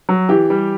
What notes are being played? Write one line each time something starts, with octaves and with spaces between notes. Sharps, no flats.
F#3
E3 G4
G3